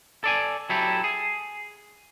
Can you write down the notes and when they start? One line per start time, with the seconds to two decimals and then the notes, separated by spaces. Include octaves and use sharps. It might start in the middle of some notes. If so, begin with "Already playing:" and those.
0.24 A4 D5 G#5
0.69 F#3 E4 G4 A4
1.04 G#4